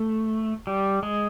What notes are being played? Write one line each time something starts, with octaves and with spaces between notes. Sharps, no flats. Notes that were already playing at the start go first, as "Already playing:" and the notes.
Already playing: A3
G3
G#3